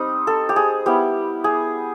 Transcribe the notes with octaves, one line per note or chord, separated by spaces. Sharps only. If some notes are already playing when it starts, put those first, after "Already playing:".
Already playing: G3 C4 D#4
A4
G4
G#4
G3 B3 E4 G4
G#4